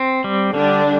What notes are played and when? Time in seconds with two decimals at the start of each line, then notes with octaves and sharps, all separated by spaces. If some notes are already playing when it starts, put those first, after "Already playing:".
Already playing: C4
0.24 G3
0.54 D3 G3 D4